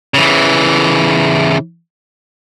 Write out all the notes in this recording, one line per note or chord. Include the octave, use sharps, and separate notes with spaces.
C#3 E3